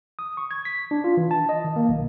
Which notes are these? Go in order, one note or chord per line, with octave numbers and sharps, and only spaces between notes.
D#6
C#6
G#6
B6
D4
F4
E3
A5
D#5
D#3
A#3
B1